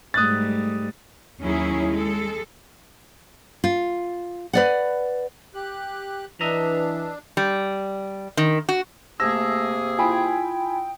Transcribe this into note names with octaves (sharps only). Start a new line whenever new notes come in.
G#2 G3 A3 D#6 F#6 A6
D#2 F#3 C#4 D#4 E4 G#4
G#3 A4
F4
B4 D5 F#5
G4 F#6
E3 D4 B4 D#5 E5 A#5
G3
D#3
F#4
C3 A3 A#3 G#4 A5 E6 A#6
E4 F4 G5 G#5 B5 D#6